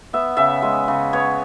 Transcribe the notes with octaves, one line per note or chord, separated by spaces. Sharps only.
B3 E5
C#3 E5
G#3
C#3
B3 C#5